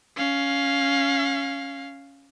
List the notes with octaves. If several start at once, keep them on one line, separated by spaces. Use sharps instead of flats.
C#4 F5